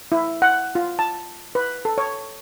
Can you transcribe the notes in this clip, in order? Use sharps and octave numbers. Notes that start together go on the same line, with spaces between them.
E4
F#5
F4
A5
B4
A4
C#5